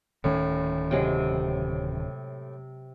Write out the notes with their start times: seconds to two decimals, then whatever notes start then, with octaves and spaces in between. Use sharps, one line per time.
0.24 D1 A2 D#3 C#4
0.91 C3 F#3 G#3